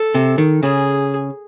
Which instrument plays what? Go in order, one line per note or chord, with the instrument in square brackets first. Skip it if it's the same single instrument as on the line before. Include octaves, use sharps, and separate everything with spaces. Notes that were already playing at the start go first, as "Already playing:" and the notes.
Already playing: [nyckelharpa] A4
[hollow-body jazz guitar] C3
D#3
[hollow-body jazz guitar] C#3 [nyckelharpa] G#4